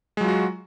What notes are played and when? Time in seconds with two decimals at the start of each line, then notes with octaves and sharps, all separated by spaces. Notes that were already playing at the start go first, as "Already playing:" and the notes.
0.17 G#3
0.21 F#3
0.24 F4
0.28 F#4